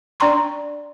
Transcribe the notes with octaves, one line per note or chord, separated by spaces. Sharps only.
D4 D5 G5 A#5 C6 C#6